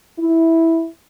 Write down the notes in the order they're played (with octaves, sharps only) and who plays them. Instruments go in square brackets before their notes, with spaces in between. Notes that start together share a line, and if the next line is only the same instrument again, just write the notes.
[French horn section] E4